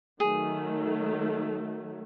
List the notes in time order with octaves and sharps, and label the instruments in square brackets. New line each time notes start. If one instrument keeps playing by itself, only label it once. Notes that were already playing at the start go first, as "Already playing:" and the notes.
[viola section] D#3 F#3 A3 [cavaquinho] G#4